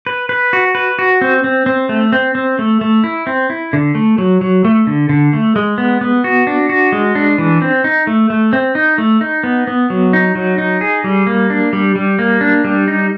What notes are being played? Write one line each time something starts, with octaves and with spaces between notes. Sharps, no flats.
B4
B4
F#4
B4
F#4
C4
C4
C4
A3
C4
C4
A3
A3
E4
C4
E4
D3
A3
F#3
F#3
A3
D3
D3
A3
G#3
B3
B3
F#4
D4
F#4
G#3
D4
E3
C4
D#4
A3
A3
C4
D#4
A3
D#4
B3
B3
F#3
D#4
F#3
D#4
G#4
G3
A#3
D4
G3
G3
A#3
D4
G3
D#4